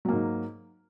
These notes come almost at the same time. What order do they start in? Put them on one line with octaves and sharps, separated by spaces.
F#3 A#3 G#2